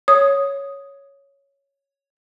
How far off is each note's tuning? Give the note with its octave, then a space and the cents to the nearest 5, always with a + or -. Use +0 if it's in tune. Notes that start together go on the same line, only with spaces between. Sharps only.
C#5 +0 D#6 +0